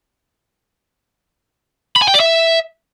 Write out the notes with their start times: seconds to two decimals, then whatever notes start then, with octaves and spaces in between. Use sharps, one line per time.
1.96 B5
2.02 G#5
2.08 G5
2.14 D5
2.20 E5